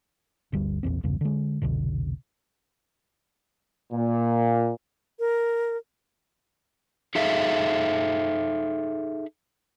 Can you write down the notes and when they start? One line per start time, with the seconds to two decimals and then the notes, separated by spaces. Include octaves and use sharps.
0.53 G1 D2 G3
0.83 E1 A#1 E2 C4
1.03 B1 E2 G2 C#3
1.21 D3 G#3
1.62 F1 C2 B2 D3
3.93 A#2
5.19 A#4
7.15 D#4 G#4 A4 E5 F5